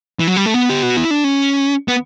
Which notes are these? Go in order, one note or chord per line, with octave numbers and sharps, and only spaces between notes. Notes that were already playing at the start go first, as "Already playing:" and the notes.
E3
F#3
G3
A3
B3
G4
F#4
E4
D4
C#4
B3